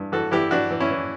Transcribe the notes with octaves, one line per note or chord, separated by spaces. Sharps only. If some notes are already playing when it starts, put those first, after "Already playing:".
Already playing: G2 E3
E3 F#4 A4
E3 E4 G4
E3 D4 F#4
E3
C#4 E4
E3